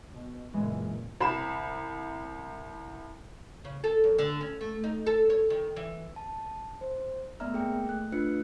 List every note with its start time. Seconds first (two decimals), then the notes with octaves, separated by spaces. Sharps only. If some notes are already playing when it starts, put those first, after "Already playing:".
0.10 B2
0.54 F#1 A#2 E3 G#3
1.21 C2 B5 E7
3.65 C#3
3.84 A4
4.04 F#2
4.19 D3
4.41 C#4
4.61 A3
4.84 D#4
5.06 A4
5.30 C#5
5.50 D#3
5.76 E3
6.16 A5
6.81 C5
7.40 A3 B3 D5 E5 A#5 F6
7.53 A#3 G#4 G5
7.86 A3 F#6
8.12 A3 D4 F4 B4 F#6 C#7